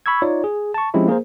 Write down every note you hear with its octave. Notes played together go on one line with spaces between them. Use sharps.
B5 C#6 E6 G#6
D#4 F4 C#5 D5
G#4
A5 C#6
F3 G#3 C4 C#4 E4 G4
A#3 G#4 A#4 C5